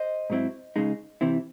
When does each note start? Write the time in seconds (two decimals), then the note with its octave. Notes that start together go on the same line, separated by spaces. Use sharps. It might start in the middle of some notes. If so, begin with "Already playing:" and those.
Already playing: C5 D#5
0.30 G#2 F#3 C4 E4
0.76 C#2 C#3 G#3 D#4
1.21 C3 E3 C4 E4